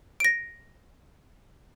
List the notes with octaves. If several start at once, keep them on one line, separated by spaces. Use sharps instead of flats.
A#6 D7